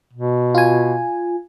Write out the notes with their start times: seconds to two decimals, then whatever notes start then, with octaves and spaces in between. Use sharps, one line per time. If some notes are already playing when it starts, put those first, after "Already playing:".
0.13 B2
0.55 F4 G#5